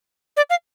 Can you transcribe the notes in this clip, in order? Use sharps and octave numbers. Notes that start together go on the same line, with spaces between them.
D5
F5